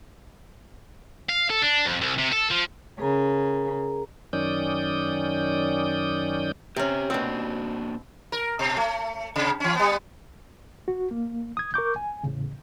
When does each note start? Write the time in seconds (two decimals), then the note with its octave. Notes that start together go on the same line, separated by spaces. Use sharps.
1.29 F5
1.50 A4
1.62 D4
1.85 F2
2.01 C2
2.18 C3
2.32 A4
2.50 F3
3.00 C#3 G#4 A#4 A#5
4.33 F#2 D#3 C#4 D5 D#6 G6
6.76 C3 C#4 G4 A#5
7.10 B2 A#3 C4 D4 F#4
8.32 A#4
8.59 B2
8.77 A3
9.36 C3
9.60 E3 C#4
9.75 G3 B3
10.88 F#4
11.11 A#3
11.57 D#6 G#6
11.74 A#4 C#6 D6 G6
11.96 G#5
12.23 E2 A2 C#3